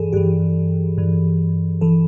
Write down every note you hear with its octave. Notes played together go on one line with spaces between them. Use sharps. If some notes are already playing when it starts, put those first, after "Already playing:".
Already playing: G2 E3 G#4 A4
G2 E3 G4
G2 E3
E3 A4